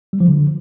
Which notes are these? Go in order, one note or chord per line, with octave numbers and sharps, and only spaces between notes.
G3
F3
D3